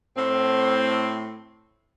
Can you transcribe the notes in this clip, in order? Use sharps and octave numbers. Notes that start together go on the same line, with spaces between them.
A2 C4